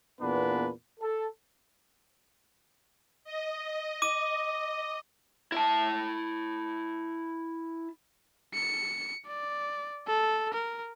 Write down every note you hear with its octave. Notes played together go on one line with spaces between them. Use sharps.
E2 A#2 B3 D4 B4
A4
D#5
D#5 D6 D#7
E4 A5
C#7
D5
A4
A#4